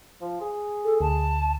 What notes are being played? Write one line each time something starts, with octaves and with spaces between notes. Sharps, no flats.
F3
G#4
A4
D2 A5